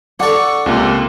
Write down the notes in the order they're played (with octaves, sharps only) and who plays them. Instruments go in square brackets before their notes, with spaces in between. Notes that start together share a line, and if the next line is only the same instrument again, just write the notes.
[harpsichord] D4 A4 [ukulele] F#5 [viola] C#6
[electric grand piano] C#2 C3 [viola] A#3 F4